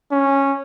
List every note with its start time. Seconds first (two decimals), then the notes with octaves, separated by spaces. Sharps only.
0.12 C#4